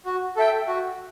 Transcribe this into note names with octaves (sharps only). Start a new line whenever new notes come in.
F#4
A4 E5 G5
F#4